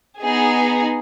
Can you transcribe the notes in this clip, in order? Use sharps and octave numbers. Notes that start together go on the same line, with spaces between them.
B3 D#4 G#4